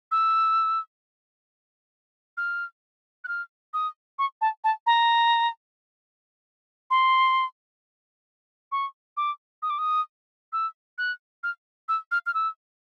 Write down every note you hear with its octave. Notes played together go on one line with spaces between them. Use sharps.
E6
F6
F#6
F6
D#6
C#6
A5
A5
A#5
C6
C#6
D6
D#6
D6
D#6
E6
F#6
F6
E6
F6
F6
E6